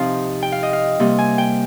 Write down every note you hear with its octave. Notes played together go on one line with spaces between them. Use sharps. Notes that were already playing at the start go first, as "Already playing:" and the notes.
Already playing: C3 F3 C4 D#4 F5
G5
F5
D#5
F5
C3 G3 A#3
G#5
G5